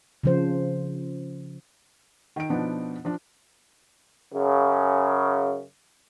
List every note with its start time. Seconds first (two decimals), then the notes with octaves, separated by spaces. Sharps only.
0.24 C#3 F3 C5
2.36 D#3 D7
2.50 B2 F3 B3 D4 D#4
3.05 F3 D4
4.33 F#2 C#3